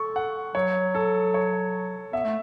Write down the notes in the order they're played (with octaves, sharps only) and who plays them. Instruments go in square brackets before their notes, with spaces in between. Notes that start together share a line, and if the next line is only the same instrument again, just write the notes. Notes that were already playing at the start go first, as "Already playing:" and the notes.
Already playing: [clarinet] A4 [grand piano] C#6
[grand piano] F#5
[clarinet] F#3 [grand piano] C#5
[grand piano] A4
C#5
[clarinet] B3 [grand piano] E5
[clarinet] A3